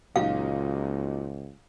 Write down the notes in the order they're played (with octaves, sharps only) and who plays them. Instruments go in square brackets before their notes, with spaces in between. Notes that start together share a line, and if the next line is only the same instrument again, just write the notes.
[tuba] C#2 [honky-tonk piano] A#2 F#3 D#4 [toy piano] F5